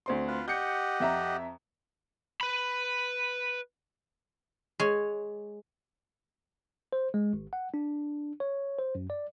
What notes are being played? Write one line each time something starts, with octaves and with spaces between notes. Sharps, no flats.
D2 C4 C6
F4 B4
G4 D#5 F#5 G6 C#7
F2 E5 A#5
B4 B5
G#3 C#5
C5
G#3
G#1
F#5
D4
C#5
C5
F#2
D5